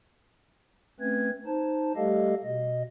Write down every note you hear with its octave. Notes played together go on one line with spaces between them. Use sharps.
A3 C4 C#4 B4 G#6
D#4 C5 A5
G3 A3 G4 A4 D#5 F5
B2 D#5